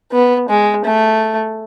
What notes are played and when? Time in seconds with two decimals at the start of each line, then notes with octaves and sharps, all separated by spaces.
0.12 B3
0.49 G#3
0.85 A3